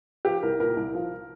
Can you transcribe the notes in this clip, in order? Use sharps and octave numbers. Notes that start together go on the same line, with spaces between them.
F3 G4
C2 A#4
A#2 A#4
C2
F3